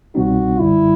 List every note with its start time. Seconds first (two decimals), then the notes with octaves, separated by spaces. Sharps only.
0.15 C2 B2 G3 C4 D#4 F#4
0.60 G1 F#2 D3 G3 E4